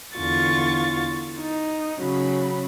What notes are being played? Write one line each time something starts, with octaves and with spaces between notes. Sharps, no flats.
E2 D3 F4 C#6 A6
D#4
C#3 F#3 B5